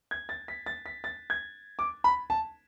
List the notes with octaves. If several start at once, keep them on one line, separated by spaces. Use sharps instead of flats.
G#6
A6
B6
A6
B6
A6
G#6
D6
B5
A5